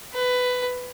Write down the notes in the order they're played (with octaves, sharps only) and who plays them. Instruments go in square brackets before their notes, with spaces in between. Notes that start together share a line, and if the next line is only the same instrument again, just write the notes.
[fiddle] B4